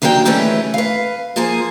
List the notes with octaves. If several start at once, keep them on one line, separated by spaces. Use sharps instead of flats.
D#2 D#3 F#3 D4 A4 G5
D#2 C#3 E3 A3 C#4 B4
B4 F5
F3 A#3 G#4 C5 G#5